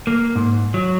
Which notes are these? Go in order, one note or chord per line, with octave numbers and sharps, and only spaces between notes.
A#3
G#2
F#3